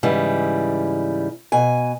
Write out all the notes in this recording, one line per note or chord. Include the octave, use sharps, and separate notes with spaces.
G#2 C#3 E3 G3
B2 G#5